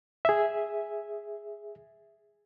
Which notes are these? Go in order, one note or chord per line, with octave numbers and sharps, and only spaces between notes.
G#4 E5